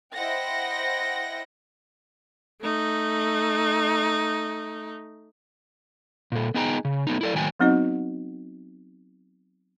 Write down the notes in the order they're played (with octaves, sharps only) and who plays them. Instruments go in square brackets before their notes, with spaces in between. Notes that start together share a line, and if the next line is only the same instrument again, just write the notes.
[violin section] E4 C5 D#5 F#5 G5 A#6
[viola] A3 D#4
[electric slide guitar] A#2 A4
B3 D#4 G#4 G5 A#5
C#3
A3 B3 D#4
E4 A4 D5
A2 D#3 F#3 G5 G#5
[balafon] F#3 B3 C4 D#4 F#4 D#5